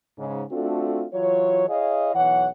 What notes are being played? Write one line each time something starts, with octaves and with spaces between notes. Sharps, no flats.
G#2 C#3
A3 C4 D4 F4 F#4 A4
E3 F#3 F4 C#5
E4 G#4 C#5 D#5 F5
B1 E3 C#5 F#5